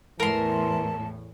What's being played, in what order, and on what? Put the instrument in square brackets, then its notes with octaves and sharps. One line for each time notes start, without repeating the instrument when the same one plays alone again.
[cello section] E2 A2 [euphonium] E3 [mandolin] A#4 C6 [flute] A5